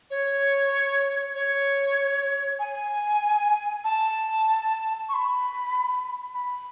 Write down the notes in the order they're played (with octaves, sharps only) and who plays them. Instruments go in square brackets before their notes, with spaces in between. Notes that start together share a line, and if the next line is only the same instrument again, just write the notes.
[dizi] C#5
C#5
G#5
A5
C#6
B5
B5